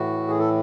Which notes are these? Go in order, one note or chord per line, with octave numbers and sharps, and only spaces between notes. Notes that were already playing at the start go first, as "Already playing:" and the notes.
Already playing: A2 E3 F#4
G#4
A4